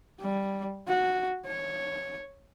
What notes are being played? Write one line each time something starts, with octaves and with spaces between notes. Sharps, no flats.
G3
F#4
C#5